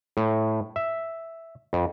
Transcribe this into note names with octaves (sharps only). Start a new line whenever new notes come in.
A2
E5
F2